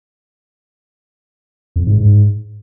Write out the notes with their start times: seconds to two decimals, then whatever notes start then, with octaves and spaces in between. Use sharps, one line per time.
1.76 F2
1.87 G#2
1.98 G#2